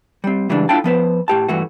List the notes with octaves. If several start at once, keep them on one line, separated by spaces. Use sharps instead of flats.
G3 C4
C#3 E3 G3 G#3 D4
D4 E4 F4 A4 G5 A5
F3 B3 B4 C5
A2 G4 A5
G2 E3 A3 F#4